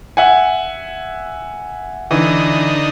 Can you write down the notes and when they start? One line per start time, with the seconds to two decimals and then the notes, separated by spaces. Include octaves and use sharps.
0.17 E5 F#5 G#5
2.11 D3 E3 D#4